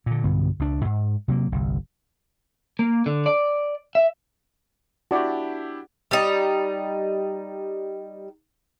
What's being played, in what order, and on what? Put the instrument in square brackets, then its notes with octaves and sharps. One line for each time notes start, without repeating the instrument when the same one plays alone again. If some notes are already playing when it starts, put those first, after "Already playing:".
[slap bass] A#2 D3
B1 G2 D3 B3
C#2 D4
G#2
C3 F#3 A#3
G1 C2
[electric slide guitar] A#3
D3
D5
E5
[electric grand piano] D4 E4 G4 [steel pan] F#4 D5
[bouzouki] G3 D#4